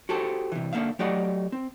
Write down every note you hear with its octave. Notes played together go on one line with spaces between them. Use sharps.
F#4 G4 A4 C5
C3 E3
D3 A#3 E5 F5
F#3 A3 G4 D5 D#5 F#5
C4